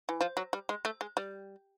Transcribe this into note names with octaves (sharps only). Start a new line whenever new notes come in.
E3
F3
F#3
G3
G#3
A3
G#3
G3